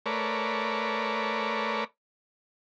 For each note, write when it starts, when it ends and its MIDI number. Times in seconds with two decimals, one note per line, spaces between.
0.06 1.84 57
0.06 1.84 70
0.06 1.84 71
0.06 1.84 73
0.06 1.84 74